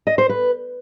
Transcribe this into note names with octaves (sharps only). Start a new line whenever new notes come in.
D#5
C5
B4